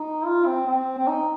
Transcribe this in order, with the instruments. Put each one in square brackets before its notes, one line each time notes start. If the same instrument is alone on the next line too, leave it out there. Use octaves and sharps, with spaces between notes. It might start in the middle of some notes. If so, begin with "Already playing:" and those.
Already playing: [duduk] D#4
F4
C4
C4
C4
D#4